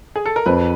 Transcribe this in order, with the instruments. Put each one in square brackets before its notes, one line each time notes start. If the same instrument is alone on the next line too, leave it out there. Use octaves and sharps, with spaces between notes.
[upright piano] G#4
A4
A#4
[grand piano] F2 [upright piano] B4